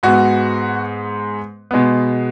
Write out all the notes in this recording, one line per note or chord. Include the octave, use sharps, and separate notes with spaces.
G#2 G#3 B3 F#4
B2 G#3 B3